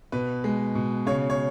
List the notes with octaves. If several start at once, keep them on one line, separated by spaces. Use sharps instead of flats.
B2 B4
G#3
B2
C#3 C#5
C#5